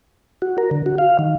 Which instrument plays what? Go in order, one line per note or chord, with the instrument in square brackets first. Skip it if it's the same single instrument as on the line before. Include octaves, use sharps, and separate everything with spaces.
[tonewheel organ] F#4
A#4
D3
F#4
F5
D#3